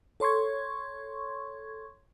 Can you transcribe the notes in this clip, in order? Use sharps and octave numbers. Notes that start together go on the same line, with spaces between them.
A4 C#5 C6 C#6 G#6